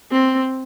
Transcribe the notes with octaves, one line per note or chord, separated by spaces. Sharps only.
C4